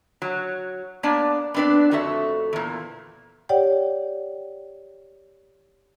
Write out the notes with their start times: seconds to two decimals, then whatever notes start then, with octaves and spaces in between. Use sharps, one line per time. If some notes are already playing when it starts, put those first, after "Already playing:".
0.22 F#3
1.03 A#3 B3 D4 D5 A5
1.54 B3 C4 D4 B4 D5
1.91 F2 A3 F#4 A4 E5
2.53 E2 A#2
3.49 G4 C#5 D5 F#5 G5